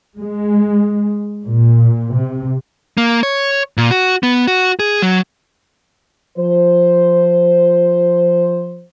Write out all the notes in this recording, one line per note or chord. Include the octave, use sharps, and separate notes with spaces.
G#3
A#2
C3
A#3
C#5
A#2
F#4
B3
F#4
G#4
F#3
F3 C5